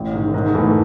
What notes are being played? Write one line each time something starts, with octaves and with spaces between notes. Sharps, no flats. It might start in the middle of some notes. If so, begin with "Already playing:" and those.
Already playing: A1
G#2 D#3
G#2
E3 A3